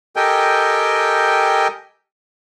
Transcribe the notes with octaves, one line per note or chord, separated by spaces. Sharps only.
G4 A4 A#4 D#5 G5 G#5